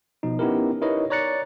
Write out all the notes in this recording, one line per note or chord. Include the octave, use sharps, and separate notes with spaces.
B2 F3 D#4
B3 C#4 D#4 E4 G4 A#4
D#4 E4 A#4 B4 C#5 D#5
C#5 D5 A#5 F#6 A6 C#7